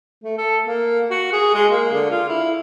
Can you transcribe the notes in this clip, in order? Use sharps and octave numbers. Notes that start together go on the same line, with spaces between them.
A3
A4
A#3
F#4
G#4
G#3
A#3
D3
F4
E4